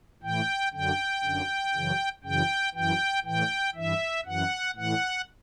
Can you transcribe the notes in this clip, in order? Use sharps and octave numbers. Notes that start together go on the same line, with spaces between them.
A2 E3 G5
F#2 D3 G5
F#2 D3
F#2 C#3 E3
F#2 C#3 E3 G5
F#2 E3 G5
A2 E3 G5
G2 E3 E5
F#2 E3 F#5
A2 E3 F#5